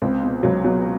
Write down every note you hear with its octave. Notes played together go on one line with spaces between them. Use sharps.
C#2 C4
B2
C#2 F#3
B2 F#3